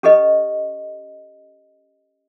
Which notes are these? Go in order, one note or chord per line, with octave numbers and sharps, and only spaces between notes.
C#4 G4 A4 B4 D#5